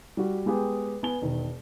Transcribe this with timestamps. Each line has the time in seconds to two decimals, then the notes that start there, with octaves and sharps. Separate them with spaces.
0.17 G3 F#4
0.46 G#3 B3 G4 G#4
1.03 B3 G#5 G7
1.22 E1 D#3